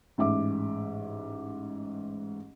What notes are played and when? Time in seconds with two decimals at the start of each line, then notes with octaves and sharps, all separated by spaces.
0.18 A1 G#2 E5 D6